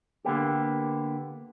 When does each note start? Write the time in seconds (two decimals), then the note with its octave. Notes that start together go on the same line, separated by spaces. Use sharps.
0.25 D3 A#3 B3 G4